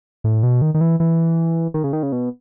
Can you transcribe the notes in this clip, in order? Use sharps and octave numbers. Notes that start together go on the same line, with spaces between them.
A2
B2
D#3
D#3
E3
E3
D#3
C#3
D#3
C#3
B2